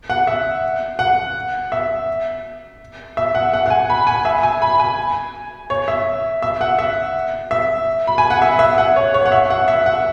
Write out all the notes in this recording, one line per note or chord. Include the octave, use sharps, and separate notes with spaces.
F#5
E5
F#5
E5
E5
F#5
F#5
F#5
G#5
B5
G#5
E5
G#5
B5
G#5
C#5
E5
E5
F#5
E5
E5
B5
G#5
F#5
E5
E5
F#5
C#5
C#5
F#5
E5
F#5
E5
F#5